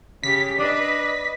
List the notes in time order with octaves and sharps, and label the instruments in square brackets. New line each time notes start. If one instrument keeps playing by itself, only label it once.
[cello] C#3 G4 [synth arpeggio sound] B6
[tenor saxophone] D4 [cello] B4 D#5